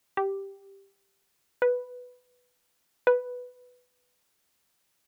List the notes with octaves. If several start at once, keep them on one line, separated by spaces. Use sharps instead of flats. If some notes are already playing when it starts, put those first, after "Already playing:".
G4
B4
B4